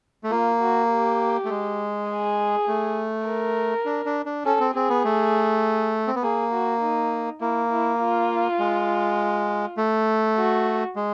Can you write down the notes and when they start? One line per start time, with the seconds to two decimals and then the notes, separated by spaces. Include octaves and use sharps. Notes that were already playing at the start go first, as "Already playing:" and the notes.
0.24 A3
0.31 A#3 F4
0.61 F#4
0.90 G4
1.45 A3
1.49 G#3
2.09 G#4
2.68 A3
3.27 A#4
3.85 D4
4.06 D4
4.26 D4
4.45 C#4 A4
4.60 C4
4.74 C4 G#4
4.89 B3
5.04 A3
6.07 C4
6.15 B3
6.22 A#3 G#4
6.53 F#4
6.81 D#4
7.41 A#3 E4
7.70 E4
8.00 F4
8.59 G#3
9.77 A3
10.37 F#4
10.96 G#3